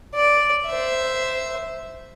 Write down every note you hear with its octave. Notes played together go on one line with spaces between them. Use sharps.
D5
C5 E5